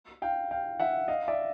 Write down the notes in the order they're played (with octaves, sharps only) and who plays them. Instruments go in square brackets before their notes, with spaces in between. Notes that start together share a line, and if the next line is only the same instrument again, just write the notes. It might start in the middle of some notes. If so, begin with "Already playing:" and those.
[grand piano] F5 G5
F5 G5
E5 F#5
D#5 F5
D5 E5